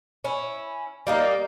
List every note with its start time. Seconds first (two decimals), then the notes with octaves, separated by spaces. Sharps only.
0.24 C#4 E4
1.07 G3 A#3 D#4